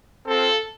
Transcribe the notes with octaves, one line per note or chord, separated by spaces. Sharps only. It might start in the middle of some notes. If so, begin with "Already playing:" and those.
C4 F4 A4